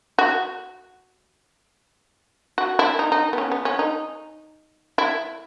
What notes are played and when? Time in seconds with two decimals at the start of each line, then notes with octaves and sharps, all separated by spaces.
0.19 F#4
2.58 F#4
2.79 E4
2.99 D#4
3.12 D#4
3.33 B3
3.38 C#4
3.52 B3
3.65 C#4
3.79 D#4
4.98 E4